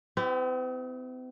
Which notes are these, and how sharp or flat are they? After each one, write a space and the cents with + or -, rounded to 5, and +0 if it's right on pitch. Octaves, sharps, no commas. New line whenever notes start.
C4 -45 E4 +0 G4 +0